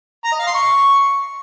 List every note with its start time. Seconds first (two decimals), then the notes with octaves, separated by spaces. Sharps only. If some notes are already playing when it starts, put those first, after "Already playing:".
0.24 A#5
0.32 D#5
0.39 F5
0.47 C6
0.54 C#6